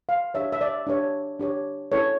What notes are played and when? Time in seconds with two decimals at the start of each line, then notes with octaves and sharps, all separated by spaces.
0.09 F5
0.34 D4 G4 C#5 E5
0.52 E5
0.61 D5
0.87 D4 G4 C#5
1.39 D4 G4 C#5
1.92 C#4 E4 A4 C#5